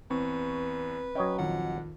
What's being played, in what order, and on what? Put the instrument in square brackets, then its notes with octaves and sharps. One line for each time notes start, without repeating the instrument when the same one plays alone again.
[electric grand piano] E2 C#6 [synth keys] C4 [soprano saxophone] B4
[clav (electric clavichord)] F#3 C#5 D#5 [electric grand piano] C#4 G5
[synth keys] A#1 D#3 F4 [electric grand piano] F2 [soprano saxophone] F#5